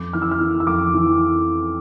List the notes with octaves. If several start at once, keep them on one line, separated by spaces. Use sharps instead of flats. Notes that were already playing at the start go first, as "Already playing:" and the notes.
Already playing: F2 D6
E3 F6
E6
F6
E3
E6
F2 D6
E3